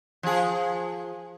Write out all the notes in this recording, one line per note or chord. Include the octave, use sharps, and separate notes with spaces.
F3 G#4